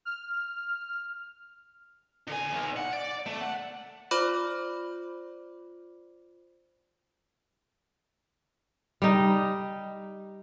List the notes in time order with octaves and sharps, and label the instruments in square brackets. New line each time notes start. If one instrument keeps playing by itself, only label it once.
[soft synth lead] F6
[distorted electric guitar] D3 G#5
B1
F#5
D5
A3
F#5
[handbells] F4 C5 D5 B5 D6 F6
[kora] G3 D#4